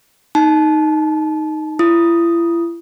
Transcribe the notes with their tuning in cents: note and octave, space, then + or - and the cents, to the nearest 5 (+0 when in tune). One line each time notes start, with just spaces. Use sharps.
D#4 +0 A5 -30
E4 +40 D#6 +0